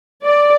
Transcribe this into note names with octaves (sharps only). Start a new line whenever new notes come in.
D5